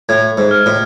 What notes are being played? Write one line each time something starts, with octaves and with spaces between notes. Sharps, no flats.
A2 G#6
G#2
F6
A2